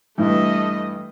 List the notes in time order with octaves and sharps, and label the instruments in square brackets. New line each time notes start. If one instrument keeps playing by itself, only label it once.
[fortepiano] G2 E3 [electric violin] A3 D#5